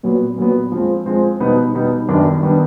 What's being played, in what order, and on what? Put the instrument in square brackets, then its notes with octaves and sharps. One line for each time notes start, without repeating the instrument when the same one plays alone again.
[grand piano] A#2 F#3 B3
A#2 F#3 B3
F3 G#3 C4
F3 G#3 C4
B2 G3 B3 D#4
B2 G3 B3 D#4
F#2 D#3 G3 B3 D4
D#3 G3 B3 D4